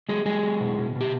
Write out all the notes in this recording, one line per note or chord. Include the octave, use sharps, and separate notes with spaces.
F#3 G#3 G#4
F#3 G#3 G#4
F#3
B2
B2
B2
G4